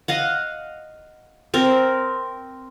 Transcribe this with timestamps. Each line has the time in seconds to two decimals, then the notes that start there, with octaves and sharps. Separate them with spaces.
0.08 D#5 F5 F#5
1.54 C4 A#4